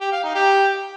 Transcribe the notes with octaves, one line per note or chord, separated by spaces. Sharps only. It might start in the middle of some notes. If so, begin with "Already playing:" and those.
G4
F5
D#4
G4